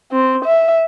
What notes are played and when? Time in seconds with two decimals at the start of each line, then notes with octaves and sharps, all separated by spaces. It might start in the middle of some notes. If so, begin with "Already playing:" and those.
0.12 C4
0.45 E5